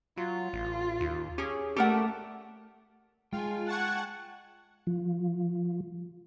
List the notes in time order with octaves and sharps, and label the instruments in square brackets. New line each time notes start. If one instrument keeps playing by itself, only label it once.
[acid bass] F#3 [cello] F4
[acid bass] A1
D#2
[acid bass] C#4 [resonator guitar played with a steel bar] G4 G#4
[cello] A3 [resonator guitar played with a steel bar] G4 A#4 F#5 [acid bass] A4
[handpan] G#3 [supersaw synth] F4 [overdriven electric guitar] G5 G#5
[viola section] F#5 [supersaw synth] A5 C#6 G#6
[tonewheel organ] F3